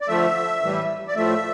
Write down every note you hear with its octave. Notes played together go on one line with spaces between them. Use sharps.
D5
D3 F3 A3 E5
A2 E3 G3
D5
A2 F3 A3 E5